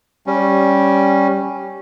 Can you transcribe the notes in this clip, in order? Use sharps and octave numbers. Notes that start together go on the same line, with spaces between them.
G3 C#4